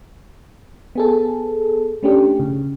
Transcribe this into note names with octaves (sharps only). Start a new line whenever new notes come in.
B3 G#4 A4
A3 C#4 D4 G4
C#3